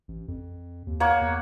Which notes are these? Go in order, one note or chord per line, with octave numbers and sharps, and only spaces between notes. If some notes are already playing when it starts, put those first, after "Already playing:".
A1
F2
D#2
A#3 C#5 F#5
E2